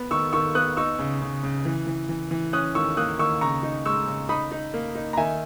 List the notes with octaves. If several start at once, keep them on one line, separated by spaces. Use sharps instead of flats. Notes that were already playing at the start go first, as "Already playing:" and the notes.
Already playing: B3
D#3 C#6 E6
D#3 C#6 E6
B3 D#6 F#6
D#4 C#6 E6
C#3
C#3
C#3
E3
E3
E3
E3
C#4 D#6 F#6
D#3 C#6 E6
A#3 D#6 F#6
D#3 C#6 E6
C#3 A#5 C#6
D#4
G#3 C#6 E6
C#3
D#4 B5 D#6
D#4
A#3
D#4
A#5
D#3 E5 G#5